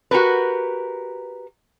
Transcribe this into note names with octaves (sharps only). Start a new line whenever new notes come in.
F#4 G4 A#4 B4